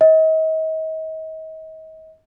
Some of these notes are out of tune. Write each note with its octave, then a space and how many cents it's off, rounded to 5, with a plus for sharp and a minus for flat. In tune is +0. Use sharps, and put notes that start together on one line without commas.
D#5 +40